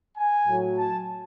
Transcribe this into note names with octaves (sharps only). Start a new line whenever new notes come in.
G#5
A2 F#3
A5